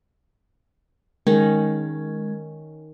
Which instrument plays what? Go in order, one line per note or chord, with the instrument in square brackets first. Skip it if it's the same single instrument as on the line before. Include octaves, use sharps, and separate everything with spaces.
[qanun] D#3 C#4 [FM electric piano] G#3